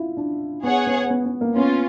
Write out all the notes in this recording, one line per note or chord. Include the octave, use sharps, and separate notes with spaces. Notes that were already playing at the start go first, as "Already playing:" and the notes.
Already playing: E4 F4
D4
B3 G#4 C#5 F#5
B3
B3
B3
A#3
B3 C#4 F4